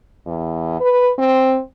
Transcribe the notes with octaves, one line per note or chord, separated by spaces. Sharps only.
E2
B4
C4